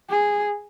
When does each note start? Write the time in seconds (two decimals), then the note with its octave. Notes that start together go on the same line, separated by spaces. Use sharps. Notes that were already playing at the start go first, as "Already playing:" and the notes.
0.10 G#4